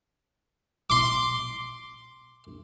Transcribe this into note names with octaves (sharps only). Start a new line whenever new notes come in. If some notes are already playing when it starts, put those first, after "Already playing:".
C6 D6